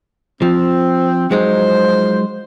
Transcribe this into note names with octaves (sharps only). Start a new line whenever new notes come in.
F3 C4
F3 F#3 G#3 D#4 C5